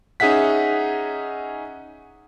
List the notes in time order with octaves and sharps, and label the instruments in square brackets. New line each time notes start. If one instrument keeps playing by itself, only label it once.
[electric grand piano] C#4 D#4 G#4 E5 F#5 B6